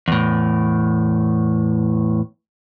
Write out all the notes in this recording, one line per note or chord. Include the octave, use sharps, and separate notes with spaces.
E2 A2